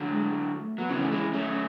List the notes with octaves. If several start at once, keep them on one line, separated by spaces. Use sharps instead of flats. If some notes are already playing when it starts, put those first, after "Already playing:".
Already playing: D3 F#3
G#3
A3
F#3 B3
C#3 E3 C#4
A3
E3 G#3
F#3 A3